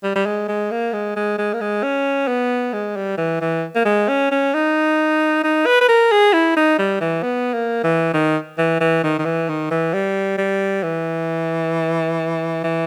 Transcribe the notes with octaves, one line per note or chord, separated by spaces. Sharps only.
G3
G3
G#3
G#3
A#3
G#3
G#3
G#3
A#3
G#3
C#4
B3
G#3
G3
E3
E3
A#3
G#3
C#4
C#4
D#4
D#4
B4
B4
A#4
G#4
E4
D#4
G3
E3
B3
A#3
E3
D#3
E3
E3
D#3
D#3
E3
D#3
E3
G3
G3
E3
E3